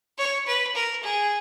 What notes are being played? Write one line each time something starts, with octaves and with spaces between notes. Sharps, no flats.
C#5
B4
A#4
G#4